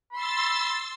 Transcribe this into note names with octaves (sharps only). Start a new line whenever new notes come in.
B5 C6 E6 A6